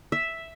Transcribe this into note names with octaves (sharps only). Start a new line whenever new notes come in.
E5